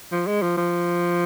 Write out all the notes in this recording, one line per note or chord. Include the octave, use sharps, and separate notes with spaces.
F3
G#3
F3
F3